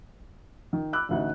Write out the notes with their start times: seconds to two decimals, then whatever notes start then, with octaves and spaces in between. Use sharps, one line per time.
0.73 D#3
0.93 B5 D6 E6 F#6
1.09 A1 D2 D#4